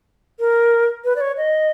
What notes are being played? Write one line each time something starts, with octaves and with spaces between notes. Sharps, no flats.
A#4
B4
D5
C#5
D#5